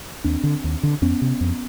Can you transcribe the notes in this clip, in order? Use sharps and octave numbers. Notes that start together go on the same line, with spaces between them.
D#2 C4 D4
D3
D#2
D3
F2 B3 C#4
C3
F2